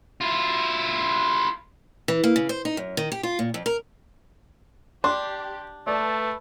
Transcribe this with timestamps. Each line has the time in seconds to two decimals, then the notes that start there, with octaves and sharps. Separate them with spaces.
0.21 E4 F4
2.08 E3
2.24 A#3
2.36 C#3
2.49 C5
2.65 D#4
2.77 F#2
2.97 D#3
3.12 G4
3.23 F4
3.39 A#2
3.54 F2
3.66 A#4
5.04 D4 G4 C6
5.87 A3 B4 D5 A5